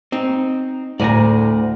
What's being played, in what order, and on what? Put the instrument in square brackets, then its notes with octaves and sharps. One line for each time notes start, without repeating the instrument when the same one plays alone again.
[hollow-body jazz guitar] C4 D#4
[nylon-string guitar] D2 [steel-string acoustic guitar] A2 [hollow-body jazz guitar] D5 G#5 A#5